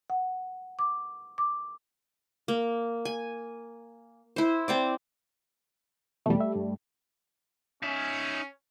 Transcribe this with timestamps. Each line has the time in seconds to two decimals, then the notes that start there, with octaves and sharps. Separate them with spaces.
0.10 F#5
0.79 D6
1.38 D6
2.48 A#3
3.05 G#5
4.36 E4 C5
4.68 C4 C5 D5
6.26 E2 B2 G3 A3
6.41 E5
6.55 G2
7.83 C#4 D#4 E5